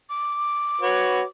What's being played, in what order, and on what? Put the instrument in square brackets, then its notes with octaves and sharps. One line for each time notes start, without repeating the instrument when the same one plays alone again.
[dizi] D6
[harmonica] F#4 B4 C#5